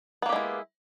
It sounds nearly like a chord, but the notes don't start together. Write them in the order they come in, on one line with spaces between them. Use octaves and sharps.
B3 A#3 G4 G#3 E4